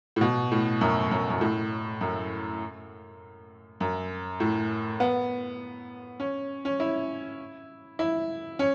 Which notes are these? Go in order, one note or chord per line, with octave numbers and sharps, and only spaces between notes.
A2
B2
A2
F#2
F#2
F#2
A2
F#2
F#2
A2
B3
C#4
C#4
E4
E4
C#4